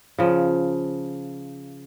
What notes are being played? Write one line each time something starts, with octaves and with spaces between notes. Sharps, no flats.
C#3 F3